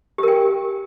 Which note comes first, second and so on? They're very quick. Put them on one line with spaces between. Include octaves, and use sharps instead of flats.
G4 A#4 G5